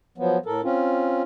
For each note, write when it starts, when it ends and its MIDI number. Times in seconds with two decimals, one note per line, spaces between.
0.18 0.38 53
0.18 0.38 54
0.18 0.38 59
0.46 0.61 45
0.46 0.61 69
0.46 0.61 70
0.64 1.22 60
0.64 1.22 61
0.64 1.22 65